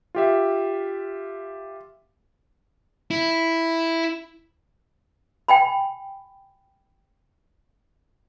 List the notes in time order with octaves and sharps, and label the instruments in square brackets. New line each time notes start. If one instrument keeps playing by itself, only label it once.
[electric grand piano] F4 G4 E5
[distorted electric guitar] E4
[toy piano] G5 G#5 B5